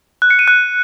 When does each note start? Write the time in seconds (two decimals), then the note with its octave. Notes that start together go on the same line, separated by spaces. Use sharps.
0.22 F#6
0.30 C#7
0.39 D#7
0.48 F#6